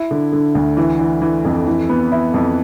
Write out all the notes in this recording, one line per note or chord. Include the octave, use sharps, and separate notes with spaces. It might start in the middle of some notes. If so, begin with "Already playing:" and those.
Already playing: E4
D3
D3
D2
E3
E3
E3
F2
E3
B3
E4
F2